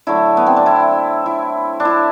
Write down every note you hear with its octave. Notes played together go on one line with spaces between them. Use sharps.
D3 F#3 A3 E4
B3
C4
D4
E4
E4
D4
E4